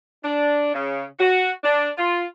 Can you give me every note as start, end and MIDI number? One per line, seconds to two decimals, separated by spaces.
0.24 0.74 62
0.74 1.04 49
1.20 1.50 66
1.64 1.89 62
1.98 2.25 65